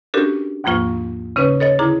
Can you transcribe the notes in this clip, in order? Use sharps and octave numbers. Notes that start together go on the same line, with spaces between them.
C#4 D4 F#4 G4 A4 A#4
D#2 G#2 F3 A#3 F4 C#6
C#3 C#4 D#4 B4 C#5
A4 C#5 D#5 A6
D3 D#4 E4 G#4 A#5 D6